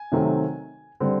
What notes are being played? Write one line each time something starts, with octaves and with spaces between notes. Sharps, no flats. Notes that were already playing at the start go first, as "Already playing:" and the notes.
Already playing: G#5
C3 D#3 F#3 A3 C4
D3 G3 C4